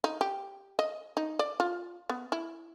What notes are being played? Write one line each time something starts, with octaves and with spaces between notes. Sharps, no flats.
D#4
G4
D#5
D#4
D5
F4
B3
E4